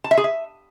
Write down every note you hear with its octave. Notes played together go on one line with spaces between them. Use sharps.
A5
E5
G#4
E5